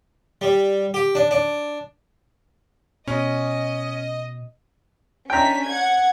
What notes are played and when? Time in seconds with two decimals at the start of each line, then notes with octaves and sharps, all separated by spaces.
0.41 G3
0.94 G4
1.15 D4
1.31 D4
3.08 B2 C#4 D#5
5.30 C#4 D4 G5 A#5 B6
5.66 F#5 G#6